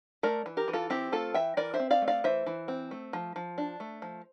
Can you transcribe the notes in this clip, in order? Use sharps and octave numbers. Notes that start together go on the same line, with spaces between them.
A3 A#4 D5
E3
G4 A#4
E3
F4 A4
C4 E4 G4
A3 F4 A4
E3 E5 G5
E3 A#4 D5
C5 E5
C4
D5 F5
A3
D5 F5
E3 C5 E5
E3
C4
A3
F3
F3
D4
A3
F3